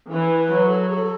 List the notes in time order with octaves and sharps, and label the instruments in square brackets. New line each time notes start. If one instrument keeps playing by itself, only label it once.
[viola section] E3 [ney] B4
[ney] B4
[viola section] F#3
[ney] A4
G#4
A4